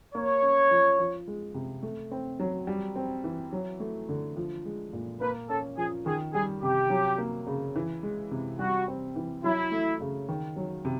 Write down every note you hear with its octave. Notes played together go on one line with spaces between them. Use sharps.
A#3 C#5
C#4
F3
F3
G#3
C3
A3
C4
F#3
G3
C4
E3
F#3
A3
D3
F3
G#3
A#2
A#3 B4
C#4 A4
F3 G#4
D#3 G#4
G3 G#4
C3 G4
F#3
A#3
C#3
E3
G#3
C3
G3 F#4
C4
E3
F#3 E4
A3
C#3
D#3
F#3
C3